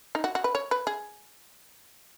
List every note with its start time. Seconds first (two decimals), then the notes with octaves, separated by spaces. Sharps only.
0.15 D#4
0.24 F#4
0.35 F#4
0.44 B4
0.55 C#5
0.71 B4
0.87 G#4